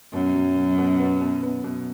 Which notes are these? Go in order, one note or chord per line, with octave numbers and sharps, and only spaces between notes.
F#2 B2
F#3
B2
B2
B3
B2
B3
B2